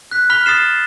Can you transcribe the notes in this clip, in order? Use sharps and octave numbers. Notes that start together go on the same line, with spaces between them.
F#6 B6
B5 F6 B6 F7 G7
D#6 A6 C7 E7